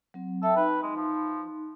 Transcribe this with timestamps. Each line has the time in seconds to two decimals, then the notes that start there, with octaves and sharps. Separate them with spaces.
0.14 F#3 C4
0.43 A4 E5 G5
0.57 D#4 B4
0.83 G#3
0.96 F3